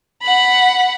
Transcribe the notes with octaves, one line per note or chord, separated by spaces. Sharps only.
F#5 B5